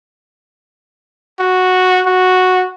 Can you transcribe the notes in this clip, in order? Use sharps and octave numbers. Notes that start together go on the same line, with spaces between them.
F#4
F#4